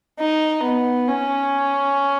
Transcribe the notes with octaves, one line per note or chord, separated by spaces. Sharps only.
D#4
B3
C#4